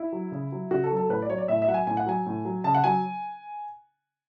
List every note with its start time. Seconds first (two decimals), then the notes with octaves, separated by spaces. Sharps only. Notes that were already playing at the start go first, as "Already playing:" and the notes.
Already playing: E4
0.12 F#3
0.32 C#3
0.52 F#3
0.71 C#3 F#4
0.84 A4
0.91 F#3
0.97 A4
1.09 A2 B4
1.22 D5
1.29 F#3 C#5
1.38 D5
1.48 A2 E5
1.62 E5
1.67 F#3 F#5
1.74 G#5
1.87 A2 G#5
1.97 F#5
2.06 F#3 G#5
2.26 A2
2.45 F#3
2.64 C#3 A5
2.75 F#5
2.84 F#3 G#5